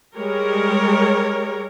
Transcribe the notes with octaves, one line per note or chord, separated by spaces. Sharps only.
G3 G#3 A#4 C#5